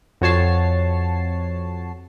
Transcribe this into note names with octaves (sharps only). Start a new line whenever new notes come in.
F2 F#4 C#5 A5 C7